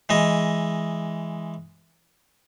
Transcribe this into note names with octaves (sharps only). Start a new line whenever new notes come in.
E3 G#3 D#5